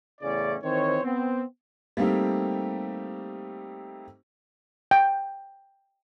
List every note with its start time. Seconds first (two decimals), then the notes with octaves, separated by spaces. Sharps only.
0.21 E2 A2 C#3 C#4 D5
0.64 D#3 E3 C4 C5 C#5
1.04 B3 C4
1.97 G3 A3 A#3 C4 D#4 G4
4.91 G5